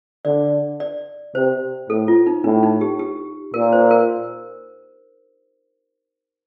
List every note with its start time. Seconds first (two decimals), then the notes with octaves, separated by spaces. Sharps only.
0.25 D3 D5
0.80 D5
1.35 C3 C5
1.90 A2 A4
2.08 F4
2.27 D#4
2.44 A2 D4
2.63 D#4
2.81 G4
2.99 G4
3.54 A#2 A#4
3.72 C5
3.91 A#4